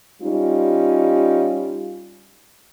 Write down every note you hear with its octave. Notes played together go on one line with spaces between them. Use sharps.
G3 C#4 D#4 F4